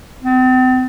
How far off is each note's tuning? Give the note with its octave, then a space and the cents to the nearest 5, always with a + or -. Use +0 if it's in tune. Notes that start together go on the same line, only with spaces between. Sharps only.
C4 -40